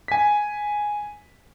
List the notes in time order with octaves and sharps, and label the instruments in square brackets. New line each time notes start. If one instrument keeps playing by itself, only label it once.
[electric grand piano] G#5 B6